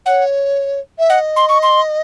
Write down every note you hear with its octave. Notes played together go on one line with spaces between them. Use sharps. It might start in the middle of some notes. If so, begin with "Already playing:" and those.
C#5 F#5
E5
D#5 F#5
C6
C#6
C6